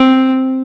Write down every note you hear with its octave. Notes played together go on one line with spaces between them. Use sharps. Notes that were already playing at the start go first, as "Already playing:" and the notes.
Already playing: C4